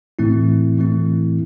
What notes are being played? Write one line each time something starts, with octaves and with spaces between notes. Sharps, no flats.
A2 E3 A3 C4 E4
A2 E3 A3 C4 E4